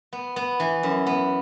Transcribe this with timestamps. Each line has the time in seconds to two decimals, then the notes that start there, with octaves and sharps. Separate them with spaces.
0.13 B3
0.36 B3
0.60 E3
0.83 F#2
1.06 B3